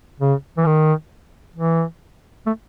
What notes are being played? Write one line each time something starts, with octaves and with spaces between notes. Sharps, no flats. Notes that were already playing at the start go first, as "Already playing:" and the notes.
C#3
E3
D#3
E3
A3